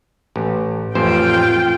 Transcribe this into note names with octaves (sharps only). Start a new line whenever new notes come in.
A1
A1 F2 F4 C5 G5